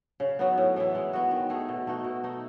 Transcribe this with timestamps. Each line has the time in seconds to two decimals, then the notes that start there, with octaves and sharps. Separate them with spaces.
0.20 C#3
0.39 F#3 B3 D#4
0.58 A2
0.76 E3 B3 E4
0.95 G#3
1.13 B3 F#4
1.31 D#3
1.50 A3 D#4 G#4
1.68 B2
1.87 A3 D#4 F#4
2.04 B2
2.23 A3 D#4